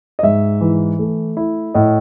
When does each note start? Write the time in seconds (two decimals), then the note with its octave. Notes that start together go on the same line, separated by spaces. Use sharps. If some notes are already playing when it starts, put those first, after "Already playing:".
0.19 D#5
0.23 G#2 E5
0.61 E3
0.99 A3
1.37 E4
1.74 A2 D#5